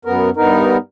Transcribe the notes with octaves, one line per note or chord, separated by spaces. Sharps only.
F#2 B3 A#4
G2 B3 D#4 A#4